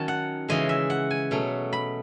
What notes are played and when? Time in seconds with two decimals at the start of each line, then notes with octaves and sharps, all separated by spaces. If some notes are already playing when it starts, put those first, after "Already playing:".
Already playing: D#3 F#3 C#4 A5
0.08 F#5
0.48 C#3 E3 G#3 D#5
0.69 E5
0.90 F#5
1.11 G#5
1.31 B2 F#3 A3 C#4
1.73 B5